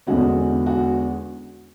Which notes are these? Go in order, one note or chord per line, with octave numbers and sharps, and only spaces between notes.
E2 D3 G#3 C#4 F#4
F#4